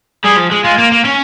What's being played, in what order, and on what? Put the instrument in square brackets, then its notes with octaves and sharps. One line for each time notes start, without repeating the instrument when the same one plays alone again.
[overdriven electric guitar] G3 [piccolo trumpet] G#4
[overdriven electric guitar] F3
G#3
[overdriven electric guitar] G#3 [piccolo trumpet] F4
[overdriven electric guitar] A#3
A#3
C#4